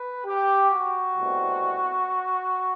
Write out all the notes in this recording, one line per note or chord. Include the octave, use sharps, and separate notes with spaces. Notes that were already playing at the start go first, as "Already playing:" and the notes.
Already playing: B4
G4
F#4
C2 B2 A3 C4